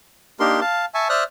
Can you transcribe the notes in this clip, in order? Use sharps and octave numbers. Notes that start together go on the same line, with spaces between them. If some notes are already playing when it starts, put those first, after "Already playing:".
A#3 D4 D#4 G4 A#4 C6
F5 A5
E5 G#5 A5 C#6
C5 D5 E5 D#6 F6 F#6